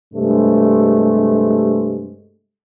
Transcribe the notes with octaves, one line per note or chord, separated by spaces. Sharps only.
G2 C3 G#3 A3